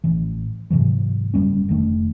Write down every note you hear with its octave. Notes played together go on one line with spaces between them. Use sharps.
A1 E3
G#2 C3 E3 F#3
F#1 F2 G3 C#4
F1 D#3 A3 D4